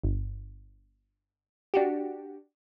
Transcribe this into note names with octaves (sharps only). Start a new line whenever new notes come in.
G1
D4 F#4 G4